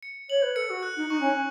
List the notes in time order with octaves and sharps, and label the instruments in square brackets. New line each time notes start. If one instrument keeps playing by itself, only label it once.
[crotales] C#7
[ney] C#5 [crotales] F#7
[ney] B4
[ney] A4 [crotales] C#7
[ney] F#4
[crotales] F#6
[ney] D#4
[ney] D#4 [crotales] C#6
[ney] C#4